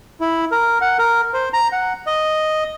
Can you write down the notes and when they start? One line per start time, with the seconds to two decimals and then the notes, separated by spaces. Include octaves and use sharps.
0.21 E4
0.52 A#4
0.81 F#5
0.99 A#4
1.34 C5
1.53 A#5
1.72 F#5
2.07 D#5